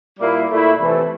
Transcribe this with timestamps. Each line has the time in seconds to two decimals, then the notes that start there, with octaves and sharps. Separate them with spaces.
0.19 A#2 G3 A#3 E4
0.49 A#2 A3 E4
0.79 C3 E3 A3